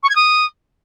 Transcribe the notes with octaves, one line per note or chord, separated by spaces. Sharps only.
C#6
G#6
D#6